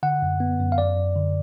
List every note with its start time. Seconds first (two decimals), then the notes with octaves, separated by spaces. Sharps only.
0.03 D3 F#5
0.22 F#2
0.40 B3
0.60 F#2
0.72 F5
0.78 F#2 D5
0.97 F#2
1.16 D3